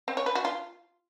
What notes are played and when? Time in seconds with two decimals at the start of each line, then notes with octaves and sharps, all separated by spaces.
0.08 C4
0.17 C#5
0.26 B4
0.35 F#4
0.45 F4